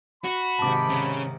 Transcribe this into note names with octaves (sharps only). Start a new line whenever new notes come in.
F#4 B5
G#2 C3 D#3 A5 D6
C#3 A#5